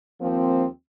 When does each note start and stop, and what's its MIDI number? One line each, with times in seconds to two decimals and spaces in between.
0.21 0.65 39
0.21 0.65 53
0.21 0.65 58
0.21 0.65 60